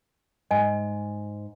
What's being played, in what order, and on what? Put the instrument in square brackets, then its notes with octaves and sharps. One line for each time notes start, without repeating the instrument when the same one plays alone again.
[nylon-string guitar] G#2 [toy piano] D#5 G#5